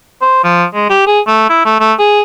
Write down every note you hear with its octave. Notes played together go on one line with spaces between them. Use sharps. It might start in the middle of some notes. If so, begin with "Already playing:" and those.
C5
F3
G#3
G4
G#4
A3
E4
A3
A3
G#4